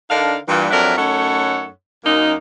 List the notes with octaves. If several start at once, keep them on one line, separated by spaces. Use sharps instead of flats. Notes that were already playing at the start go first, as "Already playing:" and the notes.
D3 D4 D#4 A#4 F5
G2 A#2 E3
F2 F#3 D4 A#4 E5 F#5
F#2 A3 D#4 A4 C#5 F#5
F#2 A#3 D#4